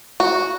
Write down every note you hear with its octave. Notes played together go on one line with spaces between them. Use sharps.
F#4